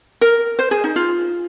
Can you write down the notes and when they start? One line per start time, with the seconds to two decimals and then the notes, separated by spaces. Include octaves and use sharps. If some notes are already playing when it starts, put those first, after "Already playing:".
0.21 A#4
0.59 C5
0.71 G#4
0.84 D#4
0.96 F4